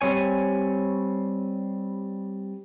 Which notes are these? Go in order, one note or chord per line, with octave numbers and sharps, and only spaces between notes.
G3 C4 C#5 G#5